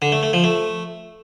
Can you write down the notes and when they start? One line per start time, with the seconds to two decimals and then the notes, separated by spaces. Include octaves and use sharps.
0.02 D3
0.12 A3
0.23 A3
0.33 F3
0.44 A3